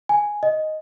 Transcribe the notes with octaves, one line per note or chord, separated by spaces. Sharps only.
G#5
D#5